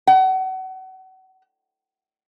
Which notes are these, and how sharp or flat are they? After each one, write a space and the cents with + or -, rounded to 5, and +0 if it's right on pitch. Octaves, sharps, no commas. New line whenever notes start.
F#5 +35